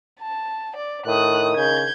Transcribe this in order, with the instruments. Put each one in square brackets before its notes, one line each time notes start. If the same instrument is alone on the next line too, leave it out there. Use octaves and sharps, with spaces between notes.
[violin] A5
D5
[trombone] A2 [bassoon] D#3 [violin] D#6 F#6
[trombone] C#3 [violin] G6 G#6